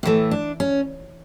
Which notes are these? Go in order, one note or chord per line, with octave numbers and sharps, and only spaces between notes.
A2 E3 A3
D4
C#4